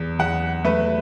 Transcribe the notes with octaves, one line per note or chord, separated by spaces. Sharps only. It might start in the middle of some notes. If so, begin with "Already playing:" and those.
Already playing: E2
E2 F#5
A3 B4